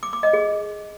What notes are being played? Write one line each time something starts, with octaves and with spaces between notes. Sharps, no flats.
D6
D6
D#5
G#4